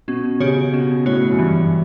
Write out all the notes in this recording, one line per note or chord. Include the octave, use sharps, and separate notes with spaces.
B2 C#4
C#3 G4 C#5
B2 C#4
A2 F#4 C#5
F#2
G2 E3